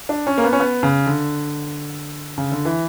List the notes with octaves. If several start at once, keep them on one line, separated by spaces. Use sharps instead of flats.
D4
C#4
A#3
B3
C#4
B3
C#3
D3
C#3
D3
E3